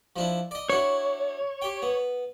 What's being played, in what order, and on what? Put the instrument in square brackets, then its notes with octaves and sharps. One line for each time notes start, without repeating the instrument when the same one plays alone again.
[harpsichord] F3 D4 E4
D5 D#5
[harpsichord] D4 E4 F#4 [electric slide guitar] C#5
[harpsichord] G4 G5
B3